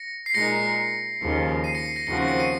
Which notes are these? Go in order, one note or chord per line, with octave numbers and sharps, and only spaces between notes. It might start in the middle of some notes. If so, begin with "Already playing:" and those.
Already playing: A#6 C#7
C7
A#2 G#3 D#4 A#4 A#6 C#7
D#2 C#3 F3
C7 D#7
A#6 C#7
C7
A#6 C#7
D#2 C#3 F3 C4 F#4 A#6 C#7
A#6
A#6 C#7
C7 D#7